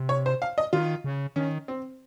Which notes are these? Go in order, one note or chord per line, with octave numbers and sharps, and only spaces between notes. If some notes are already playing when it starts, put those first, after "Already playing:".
Already playing: C3
C#5
C5
F5
D#5
D#3 F4
C#3
D#3 C#4
C4